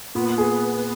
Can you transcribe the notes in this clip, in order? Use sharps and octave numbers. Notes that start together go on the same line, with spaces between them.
A#2 B3
G#4